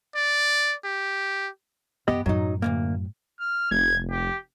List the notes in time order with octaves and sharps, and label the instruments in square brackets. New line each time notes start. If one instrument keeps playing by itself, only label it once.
[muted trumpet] D5
G4
[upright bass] F#2 [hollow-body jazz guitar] B3 G4 D#5
[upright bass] F#2 A2 [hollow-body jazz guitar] F#3 D#4
[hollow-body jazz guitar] D2 G2 A#3
[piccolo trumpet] F6
[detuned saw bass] F1 [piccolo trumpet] G#6
[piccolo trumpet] G4